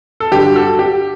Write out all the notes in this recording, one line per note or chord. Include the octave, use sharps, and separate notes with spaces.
A4
G2 D3 F#3 G4
F#4 A4
G4